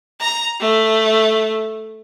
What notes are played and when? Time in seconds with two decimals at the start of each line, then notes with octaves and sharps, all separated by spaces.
0.21 A#5
0.60 A3